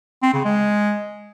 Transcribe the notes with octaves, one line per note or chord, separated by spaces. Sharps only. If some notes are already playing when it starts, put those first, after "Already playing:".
C4
C#3
G#3